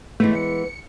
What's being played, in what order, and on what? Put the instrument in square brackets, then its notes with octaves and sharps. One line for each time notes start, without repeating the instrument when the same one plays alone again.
[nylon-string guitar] E3 G#3 B3 [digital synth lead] A3
[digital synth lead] C#7